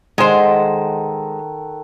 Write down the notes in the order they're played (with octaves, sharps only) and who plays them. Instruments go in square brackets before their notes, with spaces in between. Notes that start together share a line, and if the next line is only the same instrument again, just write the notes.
[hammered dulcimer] D#3 F#4 A4 [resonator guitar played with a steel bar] G#3 C5